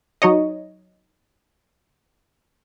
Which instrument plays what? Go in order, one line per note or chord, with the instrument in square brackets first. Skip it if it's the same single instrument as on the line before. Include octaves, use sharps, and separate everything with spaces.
[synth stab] F#3 D#4 C#5 D#5